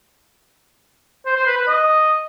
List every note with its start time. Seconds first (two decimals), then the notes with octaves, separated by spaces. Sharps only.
1.26 C5
1.36 C5
1.47 B4
1.57 B4
1.68 D#5